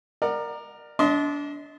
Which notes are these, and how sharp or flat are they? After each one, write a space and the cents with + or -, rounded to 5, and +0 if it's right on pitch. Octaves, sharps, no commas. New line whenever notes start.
A#4 +0 D5 +30 F#5 +0
D4 -25 D#5 +30 C6 -15